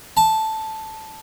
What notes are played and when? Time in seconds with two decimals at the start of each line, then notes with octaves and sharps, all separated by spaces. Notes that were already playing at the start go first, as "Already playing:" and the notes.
0.17 A5